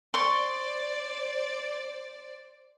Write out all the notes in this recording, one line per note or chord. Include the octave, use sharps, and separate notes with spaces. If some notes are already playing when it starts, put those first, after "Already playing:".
C5 D5 C6 C#6